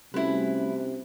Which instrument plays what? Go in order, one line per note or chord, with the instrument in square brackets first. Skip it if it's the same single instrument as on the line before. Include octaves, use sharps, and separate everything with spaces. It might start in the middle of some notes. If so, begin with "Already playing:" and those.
[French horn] C3 [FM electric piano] G3 A3 F#4 [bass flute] C#4 [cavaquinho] E4 B4